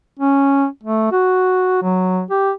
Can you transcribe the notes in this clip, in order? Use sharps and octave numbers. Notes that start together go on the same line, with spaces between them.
C#4
A3
F#4
F#3
G4